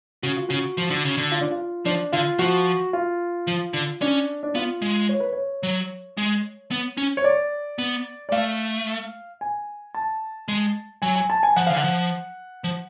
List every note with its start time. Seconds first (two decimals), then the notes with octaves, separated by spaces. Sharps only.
0.23 C#3 F#4
0.36 F4
0.49 C#3 F#4
0.77 F3
0.90 D3
1.05 C#3
1.17 D3
1.32 F4
1.41 D4
1.51 F4
1.85 F3 D4
2.13 D3 F4
2.39 F3 F#4
2.93 F4
3.47 F3
3.74 D3
4.01 C#4 D4
4.43 D4
4.55 B3 F4
4.82 G#3
5.09 C#5
5.20 B4
5.33 C#5
5.63 F#3
6.17 G#3
6.71 B3
6.97 C#4
7.17 C#5
7.24 D5
7.78 B3
8.29 D5
8.32 A3 F5
9.41 G#5
9.94 A5
10.48 G#3
11.02 F#3 G#5
11.16 G#5
11.30 A5
11.43 G#5
11.56 F3 F#5
11.67 D3 F5
11.76 F#5
11.84 F3
12.64 F3